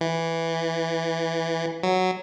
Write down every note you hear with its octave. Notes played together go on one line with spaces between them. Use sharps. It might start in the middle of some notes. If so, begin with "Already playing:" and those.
E3
F#3